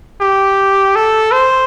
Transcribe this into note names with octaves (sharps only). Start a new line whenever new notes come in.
G4
A4
C5